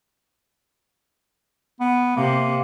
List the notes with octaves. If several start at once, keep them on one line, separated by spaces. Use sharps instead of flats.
B3
C3 A#3